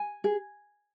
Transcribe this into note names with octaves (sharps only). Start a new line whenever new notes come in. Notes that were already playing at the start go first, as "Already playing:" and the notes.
Already playing: G#5
G#4